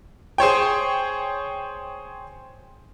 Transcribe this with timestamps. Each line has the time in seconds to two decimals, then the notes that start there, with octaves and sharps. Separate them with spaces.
0.38 G#4 C5 C#5 G5